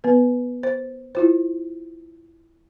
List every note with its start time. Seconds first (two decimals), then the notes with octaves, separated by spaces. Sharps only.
0.04 B3 B4
0.63 C5
1.15 E4 F4 C5